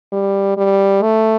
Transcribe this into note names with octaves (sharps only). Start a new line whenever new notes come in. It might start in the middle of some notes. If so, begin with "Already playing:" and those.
G3
G3
A3